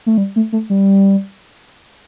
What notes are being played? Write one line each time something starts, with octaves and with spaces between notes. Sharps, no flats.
A3
G3
A3
A3
G3